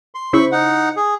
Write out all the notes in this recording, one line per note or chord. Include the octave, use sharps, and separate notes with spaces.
C6
C#3 E4 C5 B5 C#6
D#4 F#5
G#4